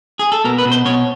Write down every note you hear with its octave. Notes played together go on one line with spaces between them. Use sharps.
G#4
A4
B2 A#4
B4
B2
C5
B2 C#5